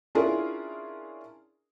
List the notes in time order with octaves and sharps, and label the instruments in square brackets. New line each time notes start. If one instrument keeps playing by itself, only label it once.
[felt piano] C#4 D4 E4 F4 G#4 A#4